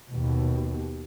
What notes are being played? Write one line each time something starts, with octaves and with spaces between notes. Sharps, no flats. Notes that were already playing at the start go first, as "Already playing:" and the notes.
D#2 B2